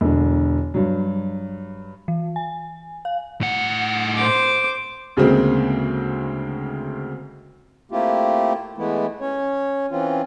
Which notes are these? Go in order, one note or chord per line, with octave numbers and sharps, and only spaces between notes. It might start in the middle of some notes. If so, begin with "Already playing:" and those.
E1 D3
G2 F#3
E3
G#5
F5
A2 F#5
C5 D6
D2 C#3 G#3 A#3 C4
A3 A#3 C4 E4 F4 G4
E3 G#3 A3 B3 E4
C#4 C#5
E3 C4 C#4 F4